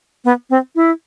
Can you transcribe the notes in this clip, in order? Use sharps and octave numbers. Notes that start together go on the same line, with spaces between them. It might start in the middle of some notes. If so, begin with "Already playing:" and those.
B3
C4
E4